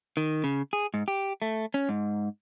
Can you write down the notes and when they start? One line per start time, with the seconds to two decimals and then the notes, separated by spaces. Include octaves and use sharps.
0.17 D#3
0.44 C#3
0.73 G#4
0.94 G#2
1.08 G4
1.42 A3
1.74 C#4
1.89 G#2